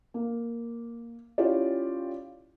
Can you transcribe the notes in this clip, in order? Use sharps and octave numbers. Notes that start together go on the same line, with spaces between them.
A#3
C#4 E4 F4 G4 C#5 D5